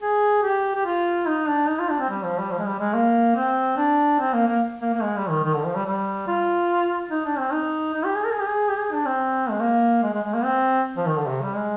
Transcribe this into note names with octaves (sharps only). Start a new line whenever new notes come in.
G#4
G4
G4
F4
D#4
D4
D#4
F4
D4
C4
G3
F3
G3
F3
G#3
G3
G#3
A#3
C4
D4
C4
A#3
A#3
A#3
A#3
G#3
G3
D#3
D#3
D3
F3
G3
G3
F4
D#4
D4
C4
D#4
D#4
G4
G#4
A#4
G#4
G4
G#4
G4
G#4
D4
C4
G#3
A#3
G#3
G#3
G#3
A#3
C4
F3
D#3
D3
C3
G3
G#3